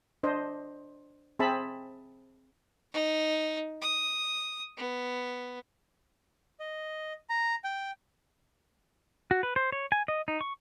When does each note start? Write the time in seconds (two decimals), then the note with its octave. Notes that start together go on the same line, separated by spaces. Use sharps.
0.23 D4 C5 D#5
1.39 C4 G#4 E5 A5 B5
2.92 D#4
3.82 D#6
4.77 B3
6.60 D#5
7.29 A#5
7.64 G5
9.31 F#4
9.43 B4
9.56 C5
9.72 C#5
9.92 G#5
10.08 D#5
10.28 D#4
10.41 C#6